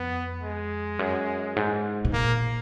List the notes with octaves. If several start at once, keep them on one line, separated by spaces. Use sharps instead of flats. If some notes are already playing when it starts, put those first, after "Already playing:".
Already playing: F2 B3
G#3
F#2
G#2
B2
A#2 A#3